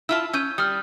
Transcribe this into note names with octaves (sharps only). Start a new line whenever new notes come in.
E4 F4 A5 E6
C#4 E6 G6 D#7
G3 D#6 F6